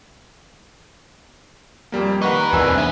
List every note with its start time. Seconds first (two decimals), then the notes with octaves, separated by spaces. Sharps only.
1.92 F2 G3 A#3
2.22 D#4 A#4 B4 F#5 C#6
2.53 E2 C4 D4 G#5 E6
2.78 B3 E5